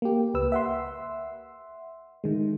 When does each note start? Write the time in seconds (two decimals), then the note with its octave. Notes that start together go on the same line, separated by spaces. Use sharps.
0.02 A#3 G4
0.34 C#2 B4 E6
0.52 E5 F#5 C6
2.24 D#3 G#3